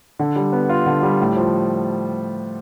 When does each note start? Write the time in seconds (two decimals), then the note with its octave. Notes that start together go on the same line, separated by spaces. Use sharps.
0.19 D3
0.36 G3
0.53 B3
0.69 F4
0.86 D3
1.03 G3
1.20 A2
1.37 F3